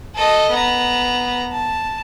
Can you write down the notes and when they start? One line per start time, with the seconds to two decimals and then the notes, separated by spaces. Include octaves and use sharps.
0.15 A4 D#5
0.50 B3 A#5
1.52 A5